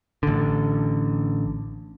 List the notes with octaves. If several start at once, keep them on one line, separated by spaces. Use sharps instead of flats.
A1 D3